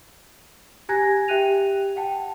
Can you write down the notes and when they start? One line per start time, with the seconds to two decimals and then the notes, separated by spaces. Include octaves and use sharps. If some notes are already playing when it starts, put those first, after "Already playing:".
0.89 G4 G#5 A#5 F#6 G#6 A#6
1.28 G4 E5 G5 F#6 D#7 F7
1.96 F#5 G5 A5